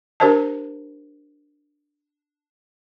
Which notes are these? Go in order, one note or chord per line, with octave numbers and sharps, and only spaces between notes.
D4 G4 A#4 C5 D#5 A5